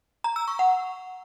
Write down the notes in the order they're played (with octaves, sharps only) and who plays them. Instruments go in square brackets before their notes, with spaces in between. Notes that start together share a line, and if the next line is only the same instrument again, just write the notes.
[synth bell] A#5
E6
C#6
F#5